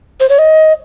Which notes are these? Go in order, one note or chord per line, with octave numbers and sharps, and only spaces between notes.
C5
C#5
D#5